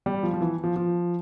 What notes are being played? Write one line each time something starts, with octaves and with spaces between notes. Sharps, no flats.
G3
F3
F3
E3
F3
F3